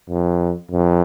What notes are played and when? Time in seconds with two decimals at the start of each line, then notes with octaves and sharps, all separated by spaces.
0.10 F2
0.71 F2